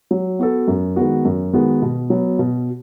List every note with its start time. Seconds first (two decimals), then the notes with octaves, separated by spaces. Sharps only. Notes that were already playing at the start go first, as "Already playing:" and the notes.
0.11 F#3
0.39 B3 F#4 A4
0.68 F#2
0.96 D#3 G#3 B3 F#4
1.25 F#2
1.53 D#3 G#3 B3 F#4
1.82 B2
2.10 F#3 B3
2.39 B2